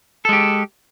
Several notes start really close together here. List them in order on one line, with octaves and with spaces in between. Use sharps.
A4 G#3 G4